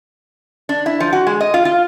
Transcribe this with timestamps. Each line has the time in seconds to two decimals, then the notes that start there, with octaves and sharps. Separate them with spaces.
0.69 D4
0.86 E4
1.00 F3
1.13 F#4
1.27 G#3
1.41 D#5
1.54 F4
1.65 F4